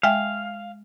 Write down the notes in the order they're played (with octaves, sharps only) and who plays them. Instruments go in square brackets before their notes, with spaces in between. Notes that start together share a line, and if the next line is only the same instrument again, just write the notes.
[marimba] G#3 E5 G5 [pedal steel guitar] F5